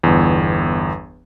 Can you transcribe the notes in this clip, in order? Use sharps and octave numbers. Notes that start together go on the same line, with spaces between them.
G1 E2